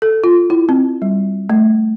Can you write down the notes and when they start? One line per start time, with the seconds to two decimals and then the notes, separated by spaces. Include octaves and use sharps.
0.02 A4
0.24 F4
0.50 E4
0.69 C4
1.02 G3
1.50 A3